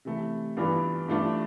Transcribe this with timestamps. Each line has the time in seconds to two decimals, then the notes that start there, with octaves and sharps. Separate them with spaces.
0.05 C3 E3 A3
0.57 G2 E3 B3 D4 F4
1.08 G2 E3 A3 D4 F4